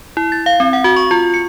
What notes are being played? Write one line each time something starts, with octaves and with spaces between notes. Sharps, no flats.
E4
A6
F5
C4
F#5
F#4
C#6
F4
C#7